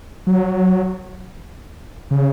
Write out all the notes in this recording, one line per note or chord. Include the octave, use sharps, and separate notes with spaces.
F#3
C#3